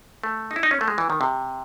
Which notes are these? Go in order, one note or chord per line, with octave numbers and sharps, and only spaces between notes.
A3
D#4
E4
D#4
C#4
A3
G#3
E3
D#3
C3